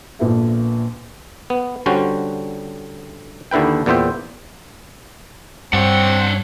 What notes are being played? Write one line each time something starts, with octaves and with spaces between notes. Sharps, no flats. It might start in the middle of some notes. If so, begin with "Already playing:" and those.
A#1 A#2 B3 A4 B4 E5
B3
D3 G3 C#4 F#4 C5
D#2 D3 E4 B4 G5
E2 A#2 B3 C5 E5 G5
G2 C4 D4 C#5 F#5